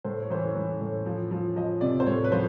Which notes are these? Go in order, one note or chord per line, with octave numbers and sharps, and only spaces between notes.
A2 C5
C#5
E3 C5
C#5
E3
A2
F3
F3
F3 D#5
C3 D5
C5
A2 C#5
B4
F3 C5